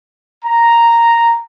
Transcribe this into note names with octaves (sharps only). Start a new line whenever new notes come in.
A#5